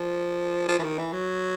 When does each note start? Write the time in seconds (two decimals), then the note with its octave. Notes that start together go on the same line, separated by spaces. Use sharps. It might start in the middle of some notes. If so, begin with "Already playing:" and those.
Already playing: F3
0.69 F3
0.79 E3
0.84 D#3
0.99 E3
1.13 F#3